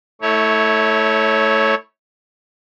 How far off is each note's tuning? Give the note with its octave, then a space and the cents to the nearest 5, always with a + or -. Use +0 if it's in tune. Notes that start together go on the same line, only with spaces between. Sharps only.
A3 +0 E4 -25 C#5 +0